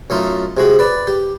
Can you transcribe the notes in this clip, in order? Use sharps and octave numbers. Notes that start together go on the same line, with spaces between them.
F#2 A3 D#4 F4
C3 G#3 F#4
B4 D5
G4